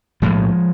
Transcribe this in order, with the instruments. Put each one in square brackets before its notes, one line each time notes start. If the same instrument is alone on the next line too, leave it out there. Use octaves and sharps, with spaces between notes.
[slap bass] B1 A2 F3 G#3